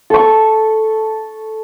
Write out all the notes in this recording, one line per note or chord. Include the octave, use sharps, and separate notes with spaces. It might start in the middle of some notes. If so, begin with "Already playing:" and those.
A4 C#6